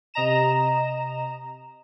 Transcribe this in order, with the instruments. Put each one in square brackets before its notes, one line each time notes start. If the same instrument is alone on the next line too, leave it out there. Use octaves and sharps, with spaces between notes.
[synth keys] C3 D#5 A#5 E7